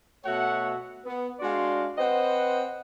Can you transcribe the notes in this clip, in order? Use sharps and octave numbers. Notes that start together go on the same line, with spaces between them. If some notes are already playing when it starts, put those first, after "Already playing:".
B2 A3 F#4 C#5 E5 F#5
B3
G#3 D4 F#4 D5 F5 C6
C4 B4 C5 D#5 F#5